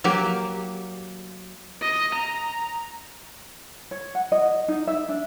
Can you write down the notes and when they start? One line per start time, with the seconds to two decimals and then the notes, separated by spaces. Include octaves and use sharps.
0.04 F#3 A#3 G4
1.81 D#5
2.14 A#5
3.91 C#5
4.15 F#5
4.32 D#5
4.68 D#4
4.87 E5
5.09 D4